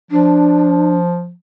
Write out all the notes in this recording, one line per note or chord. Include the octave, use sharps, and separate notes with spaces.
F3 D4